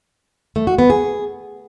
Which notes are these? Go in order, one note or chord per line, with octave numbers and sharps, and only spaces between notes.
A3
F#4
B3
G#4